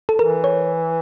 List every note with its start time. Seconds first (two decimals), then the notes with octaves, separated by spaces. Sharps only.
0.09 A4
0.19 E3 A#4
0.44 C#5